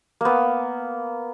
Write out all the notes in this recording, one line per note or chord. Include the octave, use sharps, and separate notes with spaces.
A#3 B3